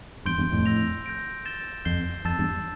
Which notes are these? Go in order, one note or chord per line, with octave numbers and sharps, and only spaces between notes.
E2 G2 C6 G6 D7 G7
E2 G2
F2 A2
E6 G6 A#6 F7
G6 A#6 D7
E6 A6 E7 G7
F2 G6 C7 G7
F2 A5 E6 A6 E7
E2 G2